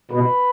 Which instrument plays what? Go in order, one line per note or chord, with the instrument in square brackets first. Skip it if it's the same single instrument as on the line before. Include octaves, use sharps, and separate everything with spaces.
[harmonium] B2 [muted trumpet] B4